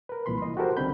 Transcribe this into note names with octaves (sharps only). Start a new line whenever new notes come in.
A#4 B4
C2 A#2 E3 B5 C6
E3 D#5
F#4 G4 A4 A#4 C5
C2 D3 D#3 C4 B5 G6